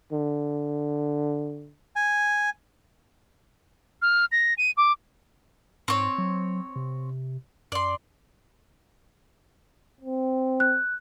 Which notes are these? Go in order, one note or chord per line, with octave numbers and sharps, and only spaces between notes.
D3
G#5
F6
A#6
D#7
D6
G#2 C4 C#5
F#3
C3
F#2 D5 C6
C4
F#6